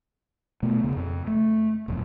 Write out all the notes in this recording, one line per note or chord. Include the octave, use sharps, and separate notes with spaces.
B2 A3 B3
E1 C#3
F2
A3
E1 A#1 F#2